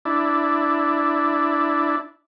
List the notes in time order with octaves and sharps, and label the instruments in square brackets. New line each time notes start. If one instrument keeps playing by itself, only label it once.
[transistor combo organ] D4 E4